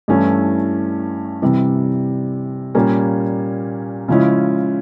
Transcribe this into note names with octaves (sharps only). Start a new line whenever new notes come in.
G2 E3 A3 C#4 E4
C3 E3 G3
A#2 G3 A#3 C#4
C#3 F3 G#3 C#4 E4